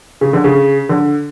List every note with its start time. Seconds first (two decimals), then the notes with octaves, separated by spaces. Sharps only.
0.21 C#3
0.33 D3
0.44 C#3
0.89 D3